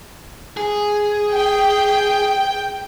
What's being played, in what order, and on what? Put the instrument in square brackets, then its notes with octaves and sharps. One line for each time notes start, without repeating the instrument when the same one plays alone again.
[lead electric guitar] G#4
[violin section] G5